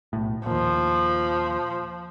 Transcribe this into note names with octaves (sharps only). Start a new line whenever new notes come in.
B1 A2
D#2 A#2 F3